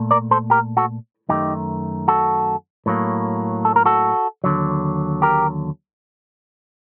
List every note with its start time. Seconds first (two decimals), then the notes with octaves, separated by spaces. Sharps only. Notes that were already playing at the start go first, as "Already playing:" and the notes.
Already playing: A#2 A3
0.11 A#4 D5
0.31 A4 C5
0.50 G4 A#4
0.77 F#4 A4
1.29 F#2 D#3 A3 D#4 G4
2.08 F#4 A4
2.86 A2 F#3 A#3
3.65 A4
3.76 A#4
3.86 F#4 A4
4.44 D#2 D3 F#3
5.22 G4 A#4